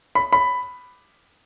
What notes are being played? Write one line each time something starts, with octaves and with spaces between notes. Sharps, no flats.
B5
B5